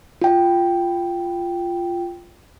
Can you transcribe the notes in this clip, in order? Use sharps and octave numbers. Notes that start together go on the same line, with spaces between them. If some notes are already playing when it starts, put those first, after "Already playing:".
F4 G5